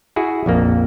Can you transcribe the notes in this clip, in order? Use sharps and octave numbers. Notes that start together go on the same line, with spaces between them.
E4 F#4 G#4
A#1 F2 A#3